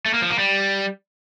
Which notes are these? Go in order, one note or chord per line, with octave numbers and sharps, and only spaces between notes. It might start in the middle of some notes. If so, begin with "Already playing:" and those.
A3
A#3
F3
A#3
G3